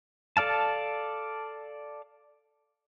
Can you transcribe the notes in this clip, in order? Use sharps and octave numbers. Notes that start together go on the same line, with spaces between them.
A4 D5 F5 A5